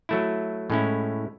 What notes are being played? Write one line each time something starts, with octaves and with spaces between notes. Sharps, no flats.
F#3 A3 E4
A2 G#3 C#4 E4